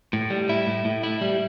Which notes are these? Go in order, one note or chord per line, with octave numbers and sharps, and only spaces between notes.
A2
G3
E4
A2
A2
E4
G3